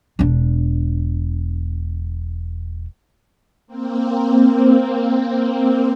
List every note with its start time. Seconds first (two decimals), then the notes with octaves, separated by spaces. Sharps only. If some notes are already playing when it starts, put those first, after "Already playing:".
0.19 E1 D4
3.67 A#3 C4